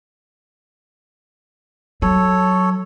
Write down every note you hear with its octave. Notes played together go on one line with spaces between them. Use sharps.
F#3 A4 C#5